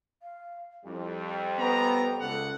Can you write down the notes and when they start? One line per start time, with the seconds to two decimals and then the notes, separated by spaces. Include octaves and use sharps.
0.22 F5
0.85 F2 G3 E4
1.25 G5
1.59 B3 A#5
2.20 C#2 A4 F#5